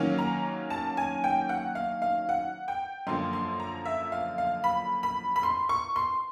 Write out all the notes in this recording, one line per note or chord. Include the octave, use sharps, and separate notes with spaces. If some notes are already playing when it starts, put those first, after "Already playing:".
Already playing: D#3 F#3 A#3 C#4
A#5
A5
G#5
G5
F#5
F5
F5
F#5
G5
F#2 D3 F3 A#3 C6
C6
A#5
E5
F5
F5
B5
B5
B5
C6
C#6
C6